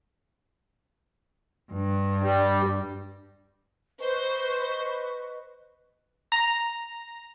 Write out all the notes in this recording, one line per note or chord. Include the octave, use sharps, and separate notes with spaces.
G2
G3
B4 C5 D#5 C#6
A#5